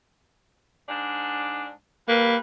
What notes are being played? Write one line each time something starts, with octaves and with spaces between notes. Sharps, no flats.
G#2 D4
G3 A#3 B4